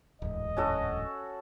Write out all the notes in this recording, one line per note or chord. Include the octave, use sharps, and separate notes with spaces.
D1 E2 G#2 D#5
C#4 F#4 A4